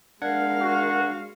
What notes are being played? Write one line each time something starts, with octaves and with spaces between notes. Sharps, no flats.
G#3 D4 A#4 F5 F#5 G#6
F#4